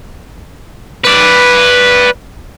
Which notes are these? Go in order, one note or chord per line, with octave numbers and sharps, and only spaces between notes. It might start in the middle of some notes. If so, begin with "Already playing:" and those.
B4 D5